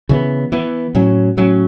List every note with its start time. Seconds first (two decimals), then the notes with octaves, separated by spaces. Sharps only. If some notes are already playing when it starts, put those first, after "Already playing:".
0.09 C#3 E3 B3
0.52 E3 B3
0.95 A2 F#3 C#4
1.37 A2 F#3 C#4